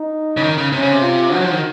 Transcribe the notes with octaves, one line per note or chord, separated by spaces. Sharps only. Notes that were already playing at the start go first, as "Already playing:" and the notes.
Already playing: D#4
C#3
D#3
C#3
C3 C#4
C#3
C3
F4
F#3 F#4
F3
D#3